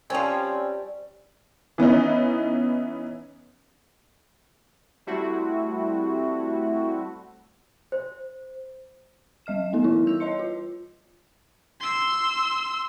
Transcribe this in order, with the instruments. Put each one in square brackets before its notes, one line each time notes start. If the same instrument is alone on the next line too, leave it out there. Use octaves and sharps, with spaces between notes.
[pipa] F3 C#4 [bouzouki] G3 [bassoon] C4
[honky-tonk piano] E3 B3 C#4 D#4
[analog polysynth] G3 A3 C4 E4 F#4
[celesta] C5
[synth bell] F#3 G3 D#5 F6 E7
A3 B3 D#4 A4
E3 G3 D#4 E4
E6 G6 F7
C#5 D#5 C6 C#7
F4
[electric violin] C6 E6